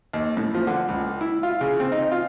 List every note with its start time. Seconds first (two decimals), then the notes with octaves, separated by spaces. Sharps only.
0.13 D#2
0.37 A2
0.54 F3
0.67 D3
0.88 C#2
1.21 E4
1.43 F4
1.61 C#3
1.80 C4
1.92 D#4
2.12 F4